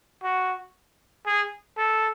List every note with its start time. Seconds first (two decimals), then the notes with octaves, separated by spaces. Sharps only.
0.23 F#4
1.26 G#4
1.77 A4